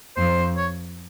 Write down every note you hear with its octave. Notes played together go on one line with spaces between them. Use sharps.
F2 C5
C#5